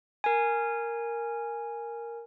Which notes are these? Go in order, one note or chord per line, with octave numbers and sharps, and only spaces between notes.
A#4 G#5